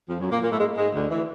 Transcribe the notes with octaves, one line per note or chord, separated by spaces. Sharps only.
F2 F3
F#2 F#3
A#2 A#3
A#2 A#3
A2 A3
G#2 G#3
G#2 G#3
D2 D3
E3